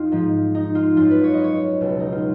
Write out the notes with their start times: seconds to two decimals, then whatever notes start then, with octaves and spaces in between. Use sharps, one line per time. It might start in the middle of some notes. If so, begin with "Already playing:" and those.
Already playing: F2 D#4 F4
0.12 G#2 F3
0.55 D#4
0.75 F4
0.96 F#2 F3 F4
1.10 B4
1.24 C#5
1.34 D#5
1.44 C#5
1.81 C#2 B2 F#3
2.00 D#4
2.12 F4